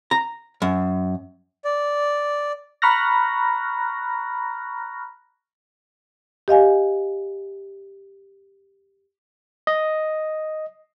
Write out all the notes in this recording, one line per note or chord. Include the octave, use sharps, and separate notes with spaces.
A#5
F#2
D5
A#5 B5 C#6 F6 F#6 A#6
G4 D#5 F5 G#5
D#5